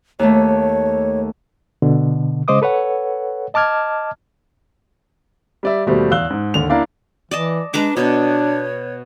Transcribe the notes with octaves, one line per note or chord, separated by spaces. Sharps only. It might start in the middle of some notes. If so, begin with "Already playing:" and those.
D#2 A3 C#5
B2 D3
C#3 G#3 C5 D#5 D6 D#6
A4 B4 C#5 F#5
D#5 A5 D6 F6 G#6
G3 D5 E5
D#2 B2 G3 A3 C5
E2 F5 E6 F#6 G7
G#2
D#2 D3 F7
A#3 D4 E4 D5 F5 A#5
E3 D5 D#5 A5
G#3 D4 B4 A#5 D6
B2 D4 C#5